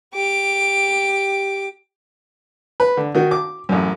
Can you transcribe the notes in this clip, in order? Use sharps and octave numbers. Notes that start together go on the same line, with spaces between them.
G4 D6
B4
D3
D#3 F#4
D6
A1 F#2